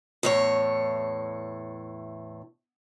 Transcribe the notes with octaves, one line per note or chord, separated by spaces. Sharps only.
E2 A2 C#5